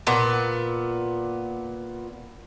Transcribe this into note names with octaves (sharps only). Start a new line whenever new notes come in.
A#2 B3